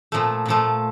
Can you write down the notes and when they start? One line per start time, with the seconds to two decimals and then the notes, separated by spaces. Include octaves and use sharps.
0.12 A#2 F3 A3
0.46 A#2 F3 A3